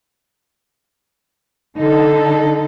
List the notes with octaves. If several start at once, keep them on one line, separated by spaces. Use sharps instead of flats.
D3 D#4 A4